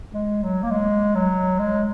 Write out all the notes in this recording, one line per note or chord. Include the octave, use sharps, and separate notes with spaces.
G#3
F#3
A#3
G#3
F#3
G#3